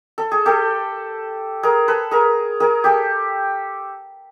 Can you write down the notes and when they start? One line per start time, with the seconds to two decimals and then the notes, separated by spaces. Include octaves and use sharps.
0.18 A4
0.32 G#4
0.46 G4 A4
1.63 G#4 A#4
1.88 A4 B4
2.11 G#4 A#4
2.60 G#4 A#4
2.84 G4 A4